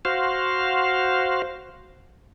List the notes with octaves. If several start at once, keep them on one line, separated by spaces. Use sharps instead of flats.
F#4 C5 F5